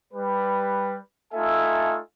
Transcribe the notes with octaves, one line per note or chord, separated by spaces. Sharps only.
G3 B4
A3 D#4 F4 A4 E5 G#5